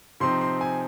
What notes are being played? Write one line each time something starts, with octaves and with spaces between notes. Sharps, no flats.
C3 F3 C4 D#4 C6
C6
G#5